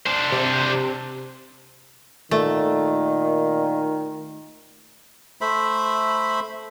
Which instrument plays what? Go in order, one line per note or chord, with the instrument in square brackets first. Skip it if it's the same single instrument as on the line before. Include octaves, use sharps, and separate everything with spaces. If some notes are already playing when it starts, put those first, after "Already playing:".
[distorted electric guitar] D4 C5
[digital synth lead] C3
[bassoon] A#2 [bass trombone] D#3 [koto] A3
[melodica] A3 C5 E5 B5